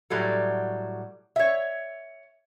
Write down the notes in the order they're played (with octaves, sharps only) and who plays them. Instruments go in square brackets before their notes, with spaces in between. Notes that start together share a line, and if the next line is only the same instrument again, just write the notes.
[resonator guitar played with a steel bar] A2 F#3 G3 A4
C#5 E5